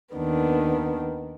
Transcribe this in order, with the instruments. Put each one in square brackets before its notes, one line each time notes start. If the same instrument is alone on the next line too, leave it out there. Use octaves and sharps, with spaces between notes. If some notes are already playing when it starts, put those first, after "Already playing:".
[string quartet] D#2 D#3 B3 D4